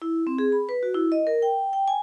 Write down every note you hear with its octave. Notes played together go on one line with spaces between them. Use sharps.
E4
C4
G#4
B5
B4
F#4
E4
D#5
A#4
G5
G5
G#5